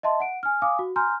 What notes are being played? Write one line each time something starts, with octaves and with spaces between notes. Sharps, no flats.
D#5 E5 A5 C6
F#5 D7
G#5 F6
F5 G#5 D6 D#6
F#4
G#5 A#5 C6 F6 G6